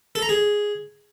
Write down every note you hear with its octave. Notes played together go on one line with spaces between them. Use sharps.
A4
A#5
G#4